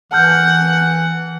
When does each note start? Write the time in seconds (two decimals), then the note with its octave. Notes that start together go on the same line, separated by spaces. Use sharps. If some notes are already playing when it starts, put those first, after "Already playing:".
0.12 E3 F#5 A5 F6 G6